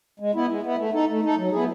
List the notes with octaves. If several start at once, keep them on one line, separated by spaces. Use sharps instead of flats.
G#3
B3 E4
G#3
B3 E4
A3
D#4 A4
A3
D#4 A4
F#3
B3 E4 G#4